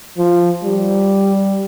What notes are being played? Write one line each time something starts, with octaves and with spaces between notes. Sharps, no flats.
F3
G3